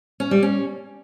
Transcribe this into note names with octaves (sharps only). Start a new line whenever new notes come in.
C#4
G3
C#4